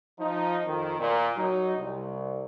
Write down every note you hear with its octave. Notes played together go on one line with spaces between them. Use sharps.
F3 D#4
F2 D#3
A#2
F#3 D#4
C2